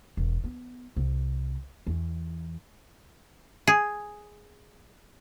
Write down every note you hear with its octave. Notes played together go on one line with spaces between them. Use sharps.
E1
B3
C2
E2
G#4